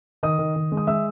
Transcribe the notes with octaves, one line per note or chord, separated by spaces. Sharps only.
D#3 D#5 D#6
D#3
D#3
G#3
D#6
G#3 E5 E6